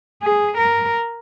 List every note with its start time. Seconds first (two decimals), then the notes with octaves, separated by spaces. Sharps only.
0.22 G#4
0.58 A#4